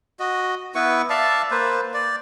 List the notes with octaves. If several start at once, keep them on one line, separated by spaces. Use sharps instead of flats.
F#4 D#5
B3 E4 B4 C#6
D5 E5 F5 A5
A#3 B4 C5
D5